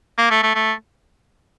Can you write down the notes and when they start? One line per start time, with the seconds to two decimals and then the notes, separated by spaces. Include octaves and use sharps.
0.18 A#3
0.31 A3
0.43 A3
0.55 A3